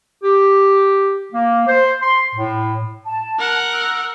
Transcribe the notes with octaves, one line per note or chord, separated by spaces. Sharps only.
G4
A#3
C5
C6
A2
A5
A#4 F#5
E6